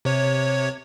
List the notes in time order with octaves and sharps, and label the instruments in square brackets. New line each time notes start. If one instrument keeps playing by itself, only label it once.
[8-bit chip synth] C3 C#5